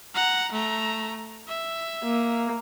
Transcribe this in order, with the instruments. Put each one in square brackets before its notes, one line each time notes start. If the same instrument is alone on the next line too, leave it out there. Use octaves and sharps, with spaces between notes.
[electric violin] F#5 A#5
A3 A#5
E5
[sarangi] A#3